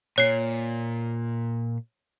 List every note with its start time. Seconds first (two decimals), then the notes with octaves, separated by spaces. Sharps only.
0.18 A#2 C#5 C7